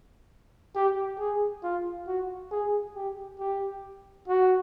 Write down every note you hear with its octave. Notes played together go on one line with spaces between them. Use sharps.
G4
G#4
F4
F#4
G#4
G4
G4
F#4